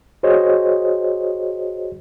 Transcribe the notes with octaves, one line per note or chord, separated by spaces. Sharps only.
F#4 G#4 C5 C#5 D#5